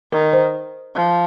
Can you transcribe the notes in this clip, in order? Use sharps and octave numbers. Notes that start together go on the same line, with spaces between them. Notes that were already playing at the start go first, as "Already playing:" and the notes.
D#3 A#4
C5
F3